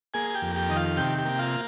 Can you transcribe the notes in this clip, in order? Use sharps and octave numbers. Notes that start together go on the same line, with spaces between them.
A#3 G#4 G#5
G#5
G4 G5
F2
G4 G5
D#3 D#5
F4 F5
C3 G4 G5
G4 G5
A#3
F4 F5